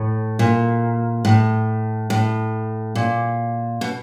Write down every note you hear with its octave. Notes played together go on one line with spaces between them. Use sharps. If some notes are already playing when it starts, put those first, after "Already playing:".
Already playing: A2
A#2
A2
A2
A#2
B2